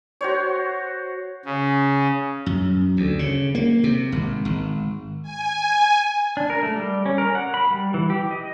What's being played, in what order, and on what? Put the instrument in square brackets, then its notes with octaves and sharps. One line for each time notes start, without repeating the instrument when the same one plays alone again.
[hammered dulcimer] F#4 C5 C#5
[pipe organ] C#3
[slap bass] F#2
D2
C#3
A#3
C3
G#1
G#1
[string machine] G#5
[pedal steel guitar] D4
A#4
A3
G3
C#4
A#4
F#5
B5
G3
E3
G4
D#5